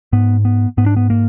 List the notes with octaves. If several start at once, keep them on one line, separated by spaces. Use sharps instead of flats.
G#2 B3
B3
G#2 B3
D4
B3
A#3